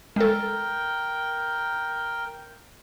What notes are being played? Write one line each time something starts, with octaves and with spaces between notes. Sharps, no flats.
G#3 A4 A#4 G5